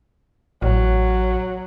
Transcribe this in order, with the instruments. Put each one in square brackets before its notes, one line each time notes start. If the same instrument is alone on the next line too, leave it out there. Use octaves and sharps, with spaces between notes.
[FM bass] A1 [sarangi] F#3